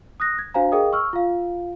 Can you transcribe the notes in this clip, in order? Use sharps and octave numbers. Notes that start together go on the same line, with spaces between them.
D#6 F#6 A#6
G#6
D4 F#4 C5 F5 G#5 A#5
G#4 A#4 D#5 F5 G5 D#6
C#6 E6 F6
F4 F5